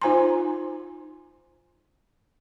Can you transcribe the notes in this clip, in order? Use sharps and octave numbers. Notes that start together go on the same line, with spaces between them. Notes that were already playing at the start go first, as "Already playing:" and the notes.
D#4 F4 C5 G#5 A#5 C6